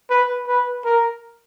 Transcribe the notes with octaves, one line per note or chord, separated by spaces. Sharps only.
B4
B4
A#4